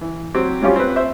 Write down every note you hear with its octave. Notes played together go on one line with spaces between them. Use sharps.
E3
F#3 C4 G4
F#3 G3 C#4 F4 G4
C4 B4
C5 E5